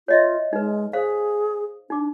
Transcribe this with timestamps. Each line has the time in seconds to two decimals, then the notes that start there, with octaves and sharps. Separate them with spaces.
0.08 F4 C#5 D#5 E5
0.53 G#3 D#4 B4
0.93 G#4 C5 F5
1.90 D4 D#4 D6